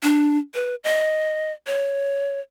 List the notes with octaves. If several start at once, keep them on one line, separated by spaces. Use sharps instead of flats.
D4
B4
D#5
C#5